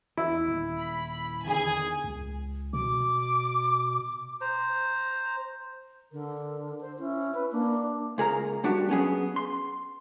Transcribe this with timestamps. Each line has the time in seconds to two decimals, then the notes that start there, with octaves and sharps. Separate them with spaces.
0.17 E2 E4
0.48 D#1
0.77 B5
1.45 E2 D3 D#3 G#4 G#5
2.04 C#2
2.73 B2 D6
4.41 C5 A#5
6.12 D3 A#4
6.81 C5
6.99 C#4 E4
7.35 B4
7.52 A#3 D4
8.18 C#2 G#4 A#4 A#5
8.64 G3 D4 F#4 G4
8.89 F#3 B3 C#4 G#4
9.36 C6